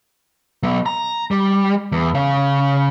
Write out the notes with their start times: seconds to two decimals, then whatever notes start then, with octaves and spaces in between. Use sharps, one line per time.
0.63 F#3 B3
0.86 A#5
1.31 G3
1.92 E2
2.14 C#3 F5